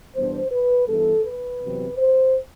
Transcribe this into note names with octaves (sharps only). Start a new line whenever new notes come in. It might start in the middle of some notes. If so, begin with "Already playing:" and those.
E2 B2 G3 B3 D4 C5
B4
G2 E3 B3 A4
B4
E2 C3 F#3 C4
C5